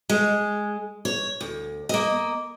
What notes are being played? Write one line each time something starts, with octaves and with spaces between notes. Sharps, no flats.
G#3
C#5
D2
A#3 D#5